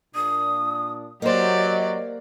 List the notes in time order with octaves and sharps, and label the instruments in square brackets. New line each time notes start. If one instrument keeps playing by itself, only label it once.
[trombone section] A#2 D4 [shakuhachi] D#6
[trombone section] F#3 [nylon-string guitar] A#3 C5 [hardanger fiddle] G4 D5 [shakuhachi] D#5